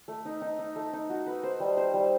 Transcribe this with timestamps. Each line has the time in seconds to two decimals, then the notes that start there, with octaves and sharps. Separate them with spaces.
0.08 A3
0.25 D#4
0.42 D#4
0.59 D#4
0.76 A3
0.93 D#4
1.10 F#4
1.27 B4
1.43 C5
1.60 G3
1.77 C5
1.94 G3